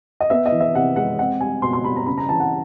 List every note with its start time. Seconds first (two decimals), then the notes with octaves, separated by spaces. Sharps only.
0.20 D#5
0.30 B3 E5
0.46 D#5
0.52 E3
0.60 E5
0.75 C3 F#5
0.96 G#3 F#5
1.19 C4 F#5
1.41 G3 G#5
1.62 B2 C6
1.73 C6
1.84 G3 B5
1.96 A#5
2.07 C#3 B5
2.18 A#5
2.29 E3 A5
2.40 F#5